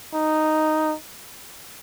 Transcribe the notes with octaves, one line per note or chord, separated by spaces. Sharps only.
D#4